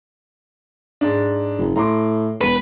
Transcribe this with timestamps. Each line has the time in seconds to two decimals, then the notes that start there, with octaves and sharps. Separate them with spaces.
1.01 G#2 D4
1.58 F#1
1.76 A2 A#5 C6 D6
2.41 E1 B4